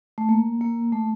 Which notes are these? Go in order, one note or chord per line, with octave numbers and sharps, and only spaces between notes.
A3
A#3
A#3
A3